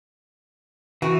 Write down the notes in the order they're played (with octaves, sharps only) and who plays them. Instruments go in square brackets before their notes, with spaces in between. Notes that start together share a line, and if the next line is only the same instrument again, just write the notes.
[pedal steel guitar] E3 [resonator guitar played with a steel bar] F#4